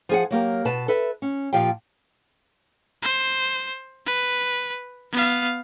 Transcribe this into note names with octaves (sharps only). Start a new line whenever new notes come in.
F3 G#4 F#5
F#3 A#3 G4 A#4
B2 B4 A5
A4 B4 E5
C#4
A#2 F3 G4 F5 G5
C5
B4
B3 F5